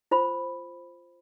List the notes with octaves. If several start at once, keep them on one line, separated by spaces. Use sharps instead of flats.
F4 C5 B5